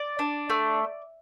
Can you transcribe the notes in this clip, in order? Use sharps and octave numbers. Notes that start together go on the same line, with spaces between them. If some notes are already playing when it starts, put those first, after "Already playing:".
Already playing: D5
D4
A3